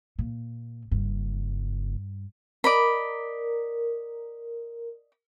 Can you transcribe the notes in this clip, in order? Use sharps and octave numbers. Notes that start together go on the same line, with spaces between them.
A#2
F#1 G2
A#4 D5 D#5 B5